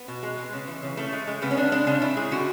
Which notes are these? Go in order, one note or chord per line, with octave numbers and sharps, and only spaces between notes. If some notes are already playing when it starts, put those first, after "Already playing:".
Already playing: B3
B2
G#3
G#3
C#3
E3
C#3
C#3 A3
G#3
G#3
C#3 B3
C#4
C#3 D4
G#3 D4
C#3 D4
C#3 E4
G#3 G#4
D3 F#4